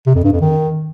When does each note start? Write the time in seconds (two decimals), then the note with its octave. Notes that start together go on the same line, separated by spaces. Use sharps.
0.07 C3
0.15 F2
0.24 G2
0.33 F2
0.41 D#3